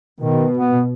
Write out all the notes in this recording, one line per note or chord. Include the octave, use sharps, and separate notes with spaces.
B2 D#3
B3